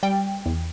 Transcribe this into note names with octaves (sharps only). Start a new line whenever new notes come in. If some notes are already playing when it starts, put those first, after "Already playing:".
G3 G5
E2